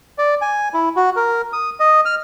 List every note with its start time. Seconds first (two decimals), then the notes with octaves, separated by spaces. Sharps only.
0.18 D5
0.42 G#5
0.74 E4
0.97 F#4
1.16 A#4
1.53 D#6
1.80 D#5
2.05 F6